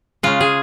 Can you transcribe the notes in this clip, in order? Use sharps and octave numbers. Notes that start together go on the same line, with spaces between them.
C#3 G#3 F4
G#4